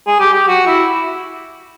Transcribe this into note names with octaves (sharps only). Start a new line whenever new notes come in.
G#4
G4
G4
F#4
E4